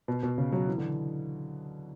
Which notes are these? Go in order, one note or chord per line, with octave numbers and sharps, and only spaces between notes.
B2
B2
C#3
F#3
E3
D3